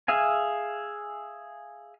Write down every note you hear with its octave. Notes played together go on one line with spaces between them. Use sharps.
G#4 E5 F5 G#5